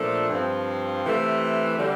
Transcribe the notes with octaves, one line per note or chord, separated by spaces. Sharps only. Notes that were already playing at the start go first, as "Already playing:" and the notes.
Already playing: A#2 F3 A3 D4 A4
G2 F3 C4
C3 E3 A3
D3 G3